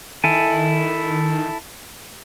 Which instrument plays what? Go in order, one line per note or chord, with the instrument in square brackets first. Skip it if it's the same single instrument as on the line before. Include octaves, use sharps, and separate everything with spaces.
[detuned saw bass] D#3 [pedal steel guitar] E4 A4 G#5